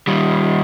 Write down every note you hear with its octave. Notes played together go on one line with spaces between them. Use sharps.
D#3 G3